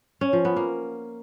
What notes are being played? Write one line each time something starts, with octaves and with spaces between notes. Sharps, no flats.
C#4
F3
B3
A#3